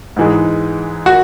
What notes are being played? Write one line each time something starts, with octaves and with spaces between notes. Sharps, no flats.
G#2 E3 G#3
F#4